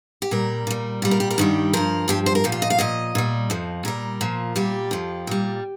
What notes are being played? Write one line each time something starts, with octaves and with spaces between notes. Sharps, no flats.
G4
A#2 G3 A#4
A#2 G3
A#2 G3 G4
A#4
G4
A#4
G2 D#3 G3 G4
G2 F3 A#4
G2 F3 G4
C5
A#4
A#2 F3 G4
F4
D#5
F5
A#2 F3 D#5
A#2 G3
F2 F3
A#2 G3 A#4
A#2 F3
A#2 G3 G4
F2 F3
A#2 G3